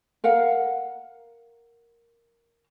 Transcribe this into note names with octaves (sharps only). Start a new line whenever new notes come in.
A#4 F5 F#5